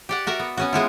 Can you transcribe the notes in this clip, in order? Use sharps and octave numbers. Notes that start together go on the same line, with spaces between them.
G4 D5 F#5
F#4 A#4 E5
B3
B3 C#4 F#4
G#3 B3 E4 F4